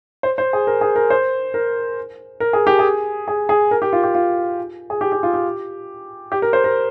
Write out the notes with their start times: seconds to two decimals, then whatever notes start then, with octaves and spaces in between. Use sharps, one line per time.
0.23 C5
0.38 C5
0.53 G#4
0.67 A#4
0.81 G#4
0.96 A#4
1.10 C5
1.54 A#4
2.40 A#4
2.53 G#4
2.67 G4
2.79 G#4
3.28 G#4
3.49 G#4
3.71 A#4
3.82 G4
3.93 F4
4.03 G4
4.15 F4
4.90 G#4
5.01 G4
5.12 G4
5.23 F4
5.34 G4
6.32 G4
6.42 A#4
6.53 C5
6.64 A#4